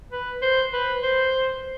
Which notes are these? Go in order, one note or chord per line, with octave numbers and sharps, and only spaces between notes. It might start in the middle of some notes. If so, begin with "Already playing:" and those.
B4
C5
B4
C5